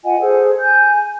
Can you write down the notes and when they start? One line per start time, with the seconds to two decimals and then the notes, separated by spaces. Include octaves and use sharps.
0.03 F4 D#5 F#5 G#5
0.20 G#4 A4 C5
0.59 G#5 G6